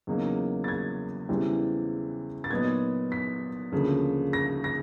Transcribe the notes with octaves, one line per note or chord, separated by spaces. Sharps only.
E2 C#3 F#3 A#3 D#4
A6
G#6
E2 C#3 E3 G3 C4
A6
A#2 F#3 B3 D#4 G#6
B6
D2 C#3 F3 A#3
A#6
A#6